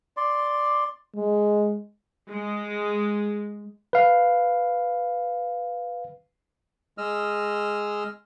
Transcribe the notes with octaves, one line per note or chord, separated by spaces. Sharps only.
D5 C6
G#3
G#3
B4 F5
G#3 D#5 E6 F6